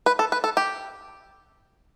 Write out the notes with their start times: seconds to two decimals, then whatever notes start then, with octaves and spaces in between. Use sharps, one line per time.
0.06 B4
0.19 A4
0.32 B4
0.44 A4
0.57 G4